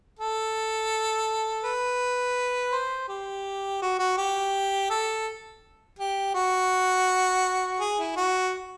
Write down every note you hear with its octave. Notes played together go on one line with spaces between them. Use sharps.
A4
B4
C5
G4
F#4
F#4
G4
A4
G4
F#4
G#4
E4
F#4